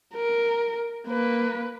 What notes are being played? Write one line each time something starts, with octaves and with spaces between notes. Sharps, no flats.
A#4
A#3 B4